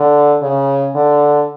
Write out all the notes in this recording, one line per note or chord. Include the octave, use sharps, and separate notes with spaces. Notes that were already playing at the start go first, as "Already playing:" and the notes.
Already playing: D3
C#3
D3